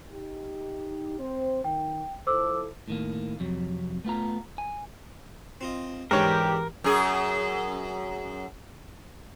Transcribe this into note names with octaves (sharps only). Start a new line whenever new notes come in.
D#4 G4
C4 C5
D#3 G5
F3 E4 A4 C5 D6 E6
A2 D#3 A#3
F2 C3 F#3
A3 B3 F4 A#5
G#5
C4 F4 D#5
E2 G#2 D4 G4 A#4 B4 C#5
F#2 G#4